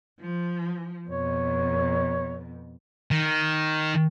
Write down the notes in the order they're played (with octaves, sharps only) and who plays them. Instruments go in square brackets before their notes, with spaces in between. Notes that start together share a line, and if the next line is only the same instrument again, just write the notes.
[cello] F3
[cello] F2 B2 [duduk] C#5
[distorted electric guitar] D#3